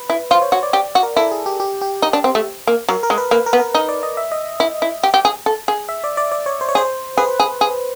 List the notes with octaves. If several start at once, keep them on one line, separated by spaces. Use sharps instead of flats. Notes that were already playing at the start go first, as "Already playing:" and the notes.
Already playing: B4
E4
F4 C5
C#5
F#4 C#5
D5
G4 D5
F#4
A#4
E4 A4
G#4
G4
G4
G4
D#4
D4
C4
A3
A#3
F#3 A#4
A#4
G#3
B4
A#3 B4
A#4
B3
A#4
D#4
D5
D#5
E5
D#5
E4
E4
G4
G4
G#4
A4
G#4
E5
D5
D5
D5
C#5
C5
C#5
G#4 C5
G#4 B4
G#4
G#4